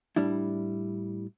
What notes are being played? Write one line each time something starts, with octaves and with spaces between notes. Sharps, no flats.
A2 G3 D4 E4